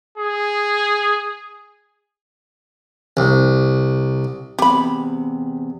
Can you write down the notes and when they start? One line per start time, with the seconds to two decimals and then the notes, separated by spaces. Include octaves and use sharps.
0.18 G#4
3.17 C2
4.59 E2 C3 G4 B5